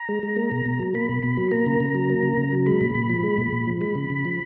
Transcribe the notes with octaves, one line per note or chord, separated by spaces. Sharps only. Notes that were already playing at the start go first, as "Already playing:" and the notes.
Already playing: A#5
G#3
G#3
A#3
B2
B2
F#3
A#3 B5
B2
B2 B5
F#3
A#3 A#5
C#3
C#3
F#3
A#3
C#3
C#3
F#3
G#3 B5
A#2
A#2
F3
G#3
A#2
A#2
F3
G#3 B5
C#3
C#3
F3